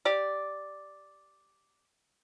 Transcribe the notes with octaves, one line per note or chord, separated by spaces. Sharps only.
G4 D5